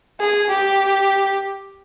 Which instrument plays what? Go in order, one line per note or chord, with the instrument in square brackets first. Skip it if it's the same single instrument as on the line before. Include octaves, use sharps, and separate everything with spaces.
[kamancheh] G#4
G4